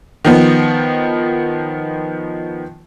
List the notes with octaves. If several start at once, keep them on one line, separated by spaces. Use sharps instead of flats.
D#3 F3 B3